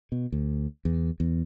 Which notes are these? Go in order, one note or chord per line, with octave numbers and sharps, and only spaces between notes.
B2
D2
E2
E2